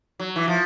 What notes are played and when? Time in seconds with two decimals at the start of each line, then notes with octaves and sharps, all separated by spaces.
0.20 F#3
0.36 E3
0.48 F3